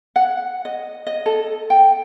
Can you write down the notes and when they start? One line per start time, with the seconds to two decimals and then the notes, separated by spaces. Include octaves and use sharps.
0.16 F#5
0.65 D#5
1.07 D#5
1.26 A4
1.70 G5